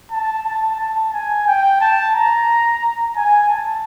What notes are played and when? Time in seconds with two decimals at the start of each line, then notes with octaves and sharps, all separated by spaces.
0.11 A5
0.46 A5
0.80 A5
1.13 G#5
1.47 G5
1.81 A5
2.15 A#5
3.17 G#5
3.49 A5